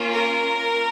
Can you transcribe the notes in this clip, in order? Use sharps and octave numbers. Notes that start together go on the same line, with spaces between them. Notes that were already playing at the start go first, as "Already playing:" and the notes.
Already playing: A#3 C#4 F4
A#4